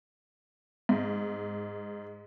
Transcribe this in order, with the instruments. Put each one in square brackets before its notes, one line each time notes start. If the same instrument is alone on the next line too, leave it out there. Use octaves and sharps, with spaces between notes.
[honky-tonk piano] G#2